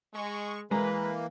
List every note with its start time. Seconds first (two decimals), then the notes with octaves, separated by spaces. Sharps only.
0.14 G#3 C#6
0.71 E3 G#3 A#3 A#4 B4 A#5